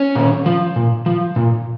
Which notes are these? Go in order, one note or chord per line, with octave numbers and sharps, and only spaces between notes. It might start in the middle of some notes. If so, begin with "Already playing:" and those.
Already playing: C#4 C#5
A#2
F3
A#2
F3
A#2